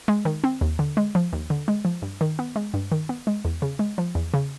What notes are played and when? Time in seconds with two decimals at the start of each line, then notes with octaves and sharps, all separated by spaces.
0.08 G#3
0.25 D#3
0.44 C4
0.61 D#2
0.79 D3
0.97 G#3
1.15 F3
1.33 D#2
1.50 D3
1.68 G#3
1.85 F3
2.02 G2
2.21 D#3
2.39 B3
2.56 G#3
2.74 G2
2.92 D#3
3.09 B3
3.27 G#3
3.45 E2
3.62 C#3
3.79 G#3
3.98 F3
4.15 E2
4.34 C#3